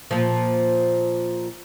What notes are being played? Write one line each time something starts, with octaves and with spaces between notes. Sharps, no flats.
A#2 F3